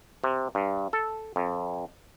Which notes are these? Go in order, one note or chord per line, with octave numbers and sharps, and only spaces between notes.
C3
G2
A4
F2